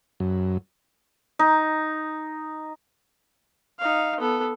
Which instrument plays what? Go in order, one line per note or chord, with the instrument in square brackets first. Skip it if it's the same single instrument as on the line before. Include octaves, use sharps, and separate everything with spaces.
[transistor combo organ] F#2
[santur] D#4
[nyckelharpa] D#4 F5
B3 A4